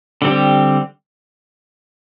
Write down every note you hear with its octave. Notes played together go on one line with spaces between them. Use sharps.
D3 G3 C4 G4